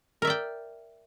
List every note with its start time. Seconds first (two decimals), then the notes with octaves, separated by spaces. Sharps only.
0.22 A#4
0.25 E5
0.27 D5
0.30 G5